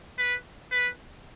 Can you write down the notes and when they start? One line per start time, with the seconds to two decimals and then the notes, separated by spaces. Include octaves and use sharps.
0.18 B4
0.72 B4